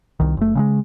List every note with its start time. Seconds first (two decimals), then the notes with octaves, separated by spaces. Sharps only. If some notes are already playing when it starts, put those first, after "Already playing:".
0.20 C2 D#3
0.37 F#1 A3
0.55 C#3 G3 G#3